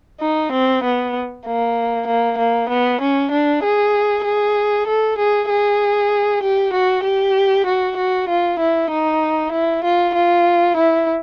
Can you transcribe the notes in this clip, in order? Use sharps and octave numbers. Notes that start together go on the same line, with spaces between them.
D#4
C4
B3
A#3
A#3
A#3
B3
C#4
D4
G#4
G#4
A4
G#4
G#4
G4
F#4
G4
F#4
F#4
F4
E4
D#4
E4
F4
F4
E4